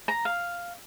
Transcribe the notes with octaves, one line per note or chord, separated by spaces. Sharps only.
A#5
F5